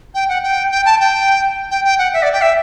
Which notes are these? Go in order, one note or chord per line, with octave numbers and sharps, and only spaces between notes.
G5
F#5
G5
G5
A5
G5
G5
G5
F#5
E5
D5
G5
E5